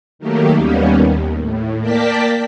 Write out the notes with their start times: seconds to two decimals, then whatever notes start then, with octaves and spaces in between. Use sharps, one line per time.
0.19 D#3 F#3 A3 A#3 G4
0.56 D#2 G3 A#3 B3 C#4
0.93 D#2
1.39 A2
1.81 A#3 A#4 D5 G5 A5 B6